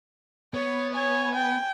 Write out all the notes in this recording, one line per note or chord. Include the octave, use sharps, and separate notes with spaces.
B3 C#5
C#5 G#5
G5